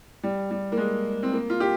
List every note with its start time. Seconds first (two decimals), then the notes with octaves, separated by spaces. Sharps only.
0.23 G3
0.51 G3
0.72 A#3
0.78 G#3
1.23 C4
1.33 A#3
1.50 F4
1.60 G4